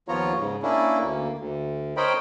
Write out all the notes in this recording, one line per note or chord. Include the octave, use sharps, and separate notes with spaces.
D#2 F3 B3 F4 C#5 A#5
G#2 C#3
A#3 C#4 D4 E4
D2 A#3
D2
A#4 C5 C#5 D#5 G5 B5